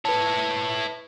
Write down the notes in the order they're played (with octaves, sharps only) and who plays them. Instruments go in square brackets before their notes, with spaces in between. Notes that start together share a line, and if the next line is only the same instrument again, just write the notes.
[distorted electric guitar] E4 C#5 [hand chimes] B4 A5